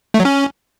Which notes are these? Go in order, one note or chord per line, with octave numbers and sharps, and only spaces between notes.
A3
F#3
C#4